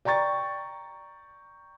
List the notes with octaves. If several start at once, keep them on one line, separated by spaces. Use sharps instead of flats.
D5 G5 A#5 C#6 A6